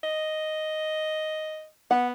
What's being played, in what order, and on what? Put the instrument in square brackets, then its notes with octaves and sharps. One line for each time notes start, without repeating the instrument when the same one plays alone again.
[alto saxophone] D#5
[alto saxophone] B3 [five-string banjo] F#5